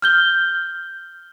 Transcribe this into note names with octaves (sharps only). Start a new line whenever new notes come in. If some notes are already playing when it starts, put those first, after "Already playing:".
F6 G6 G7